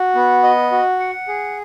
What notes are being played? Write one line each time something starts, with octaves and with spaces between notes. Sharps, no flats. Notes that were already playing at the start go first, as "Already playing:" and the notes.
Already playing: F#4
B3
D#5
F#4
F#5
G#4